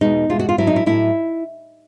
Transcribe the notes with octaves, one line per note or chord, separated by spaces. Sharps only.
E2 B2 G#3 D#4
E2 B2 G#3 F4
F#4
F4
A2 F#3 E4
D#4
E4
A2 F#3 E4